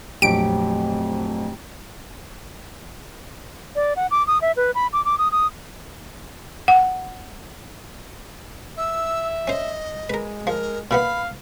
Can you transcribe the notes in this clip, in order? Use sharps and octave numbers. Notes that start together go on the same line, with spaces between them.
A#1 F2 F#3 A3 G4 D7
D5
F#5
D6
D#6
E5
B4
B5
D6
D6
D#6
D#6
F#5
E5 E6
C#4 C5 D#5
G#3 A#4 B4
F3 A#4
A#2 E3 B3 F5 B5